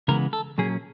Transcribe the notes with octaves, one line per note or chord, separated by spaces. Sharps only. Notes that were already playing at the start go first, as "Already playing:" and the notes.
C#3 E3 G#3 B3 A#4
A4
A#2 F#3 A#3 C#4 G#4